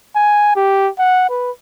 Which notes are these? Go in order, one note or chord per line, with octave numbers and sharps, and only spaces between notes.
G#5
G4
F#5
B4